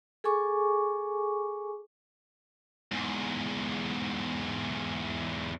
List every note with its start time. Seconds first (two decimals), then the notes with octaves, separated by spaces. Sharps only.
0.24 G#4 A4 G#5 C#6 D6
2.92 E2 G#2